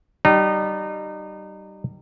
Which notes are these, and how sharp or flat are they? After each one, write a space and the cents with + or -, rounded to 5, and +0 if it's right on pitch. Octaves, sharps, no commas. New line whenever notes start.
G3 -20 D#4 -30